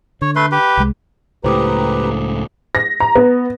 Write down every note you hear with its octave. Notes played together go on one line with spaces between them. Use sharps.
D3 C#5
A3 B4 C6
G4 B4
C2 G#3
C#2 A2 G4 B4 C5 A#5 D6 D#6
A#6
A#5
B3